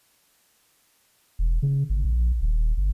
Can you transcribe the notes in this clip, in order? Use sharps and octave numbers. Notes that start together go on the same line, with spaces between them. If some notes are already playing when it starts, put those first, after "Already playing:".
E1
C#3
G#1
A#1
D#1
G1